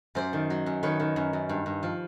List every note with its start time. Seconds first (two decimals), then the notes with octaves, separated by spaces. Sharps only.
0.15 F#2 C5 D5
0.33 D#3
0.50 F#3
0.66 F#2
0.83 D#3 B4 C#5
1.00 D#3
1.16 F#2
1.33 F#2
1.49 G2
1.66 G2
1.83 F3